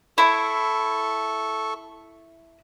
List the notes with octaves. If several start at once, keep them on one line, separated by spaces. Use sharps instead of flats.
E4 A4 C#6